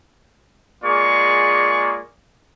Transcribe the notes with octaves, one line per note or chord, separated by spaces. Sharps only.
G#3 A#3 F4 G#4 D5 C#6